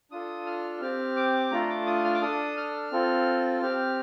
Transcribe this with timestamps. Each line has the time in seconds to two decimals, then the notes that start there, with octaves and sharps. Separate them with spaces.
0.11 D4 F4 A4 D#6
0.46 F6
0.81 C4 G4 F6
1.16 D6
1.51 A3 D4 F4 A4 A#5
1.69 D6
1.86 D#6
2.04 F6
2.14 D6
2.21 D4 A4 D#6
2.57 F6
2.92 C4 F4 A4
3.62 C4 G4